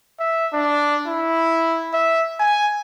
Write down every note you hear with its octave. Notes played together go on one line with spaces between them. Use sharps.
E5
D4
E4
E5
G#5